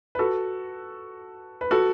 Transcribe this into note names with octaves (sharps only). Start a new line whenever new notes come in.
B4
F#4 A4
B4
F#4 A4